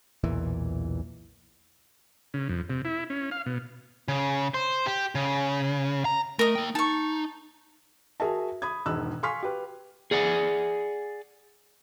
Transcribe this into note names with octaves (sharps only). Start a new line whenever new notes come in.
B1 E2 A#2 E3
C#3
F2
C3
E4
C#4
F5
B2
C#3
C5
G4
C#3
A#5
A3 A#4 D#5
A#3 G5
D#4 A5 C#6
F#4 G#4 A#4 E5 A5
B5 D#6 G#6
E1 G#2 D#3 E6 F#6
F5 G#5 C6 C#6 F6 B6
G4 B4
G#4 D5 F#5 G#5